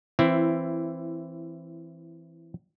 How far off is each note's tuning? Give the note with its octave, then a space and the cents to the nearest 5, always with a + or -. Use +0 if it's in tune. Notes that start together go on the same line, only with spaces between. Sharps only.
E3 +5 C4 +5 E4 +20